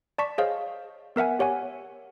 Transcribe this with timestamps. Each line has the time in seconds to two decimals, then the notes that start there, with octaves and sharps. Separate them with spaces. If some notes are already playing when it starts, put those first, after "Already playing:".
0.18 D5 A5 C#6 B6
0.38 G#4 C5 C#5 D#5 F5
1.16 B3 A#4 E5 F#5 G#5
1.39 G4 C#5 F#5 G#5